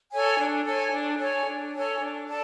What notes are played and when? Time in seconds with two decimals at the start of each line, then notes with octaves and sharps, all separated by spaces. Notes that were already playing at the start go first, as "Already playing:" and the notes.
0.11 A4 C#5 G#5
0.38 D4
0.65 A4 C#5 G#5
0.92 D4
1.19 A4 C#5 G#5
1.46 D4
1.73 A4 C#5 G#5
2.00 D4
2.27 A4 D5 A5